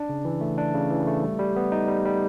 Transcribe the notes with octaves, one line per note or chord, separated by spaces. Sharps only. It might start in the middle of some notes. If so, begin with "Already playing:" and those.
Already playing: D4
C#3
E3
A3
D4
C#3
E3
A3
G3
G3
B3
D#4
G3
G3